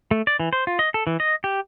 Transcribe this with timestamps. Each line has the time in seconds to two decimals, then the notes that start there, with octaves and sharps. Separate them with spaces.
0.11 A3
0.27 D5
0.40 E3
0.53 C5
0.67 F4
0.79 D#5
0.94 A4
1.07 E3
1.20 D#5
1.44 G4